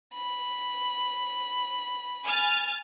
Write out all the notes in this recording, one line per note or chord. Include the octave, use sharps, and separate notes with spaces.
B5
G#5 F6 A6